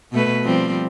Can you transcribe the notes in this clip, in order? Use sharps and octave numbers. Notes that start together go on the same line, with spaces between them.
B2 A3 B4
F3 G3 C4